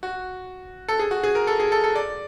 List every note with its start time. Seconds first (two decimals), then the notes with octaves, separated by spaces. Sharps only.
0.03 F#4
0.88 A4
0.99 G#4
1.11 F#4
1.23 G#4
1.35 A#4
1.47 A4
1.60 G#4
1.72 A4
1.84 A4
1.95 D5